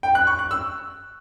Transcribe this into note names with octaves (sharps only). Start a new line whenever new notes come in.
G5
F#6
C#6
F#6
E6